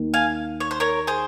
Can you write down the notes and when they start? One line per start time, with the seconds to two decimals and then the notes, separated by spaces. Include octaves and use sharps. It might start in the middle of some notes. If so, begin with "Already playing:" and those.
Already playing: D#2 D#3 A#3
0.14 F5 G#5
0.60 C#5
0.71 C5
0.80 A#4 C#5
1.07 G#4 C5